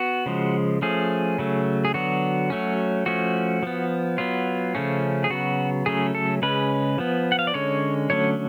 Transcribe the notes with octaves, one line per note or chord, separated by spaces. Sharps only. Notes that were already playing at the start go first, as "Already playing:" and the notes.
Already playing: B3 F#4
C#3 F3 G#3
F3 A3 C#4 G#4
C#3 F#3 A3
G#4
D3 F#3 B3 F#4
F#3 A3 C#4
F3 A3 C#4 F#4
F3 B3
F#3 B3 F4
C#3 F3 A3 C#4
G#4
C#3 F#3 B3 F#4
C#3 F#3 A3 C#4 G#4
A4
C#3 G#3 C#4 B4
F3 B3
F#5
F5
D5
D3 G#3 C#4 C#5
D3 F#3 A3 C#4 C#5